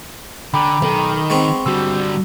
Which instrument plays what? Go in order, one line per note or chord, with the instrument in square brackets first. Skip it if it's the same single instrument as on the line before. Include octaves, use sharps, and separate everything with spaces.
[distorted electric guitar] D3 [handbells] G5 A#5 D6 [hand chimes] B5
[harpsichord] B1 [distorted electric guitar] D#3
[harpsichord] G#3 B3 C4 [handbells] C6 C#6
[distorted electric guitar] D3 G3 [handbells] F#4 E6